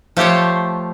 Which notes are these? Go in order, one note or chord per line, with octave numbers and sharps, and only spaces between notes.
F3 A3 G4 C5 C#5